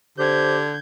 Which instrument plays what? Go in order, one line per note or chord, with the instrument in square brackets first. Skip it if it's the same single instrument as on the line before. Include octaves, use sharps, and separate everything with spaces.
[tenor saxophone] D3 [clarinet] G4 [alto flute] C5 [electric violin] G6 G#6